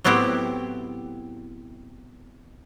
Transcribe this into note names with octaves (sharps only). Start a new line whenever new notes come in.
A2 F#3 B3 C4 E4 G4